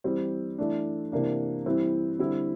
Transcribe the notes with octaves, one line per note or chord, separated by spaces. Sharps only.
E3 G3 C4
E3 A3 D4
C3 E3 A#3 D4
E3 G3 C4 E4
D3 G3 C4 E4